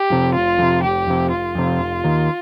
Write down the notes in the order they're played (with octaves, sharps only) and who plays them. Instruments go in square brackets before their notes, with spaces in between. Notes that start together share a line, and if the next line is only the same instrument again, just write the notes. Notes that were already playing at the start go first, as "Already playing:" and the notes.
Already playing: [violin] G4
[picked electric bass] F2 C3
[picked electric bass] F1 [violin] F4
[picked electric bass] F2 C3
[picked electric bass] F1 [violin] G4
[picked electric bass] F2 C3
[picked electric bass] F1 [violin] F4
[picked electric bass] F2 C3
F1
D#2 D#3